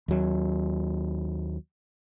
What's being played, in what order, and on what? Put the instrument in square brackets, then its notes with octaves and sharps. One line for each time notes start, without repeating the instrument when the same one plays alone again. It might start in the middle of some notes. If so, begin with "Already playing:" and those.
[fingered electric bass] D#2 F#3